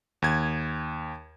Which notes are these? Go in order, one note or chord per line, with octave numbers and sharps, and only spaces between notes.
D#2 G#6